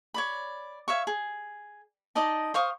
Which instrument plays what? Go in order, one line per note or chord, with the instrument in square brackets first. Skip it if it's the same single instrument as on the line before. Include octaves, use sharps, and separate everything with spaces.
[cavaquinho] C#5 D5 B5
C#5 E5 F5 C#6
G#4
D#4 D5 D#5 A5
C5 F5 C#6 D#6